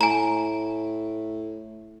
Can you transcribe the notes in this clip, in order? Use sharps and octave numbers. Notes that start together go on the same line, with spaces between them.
A2 G#5 A#5